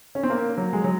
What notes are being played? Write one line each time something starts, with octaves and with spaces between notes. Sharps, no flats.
C#4
C4
A#3
F#3
G#3
F#3